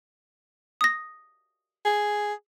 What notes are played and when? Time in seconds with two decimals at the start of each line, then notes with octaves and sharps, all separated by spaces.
0.81 D#6 A#6
1.85 G#4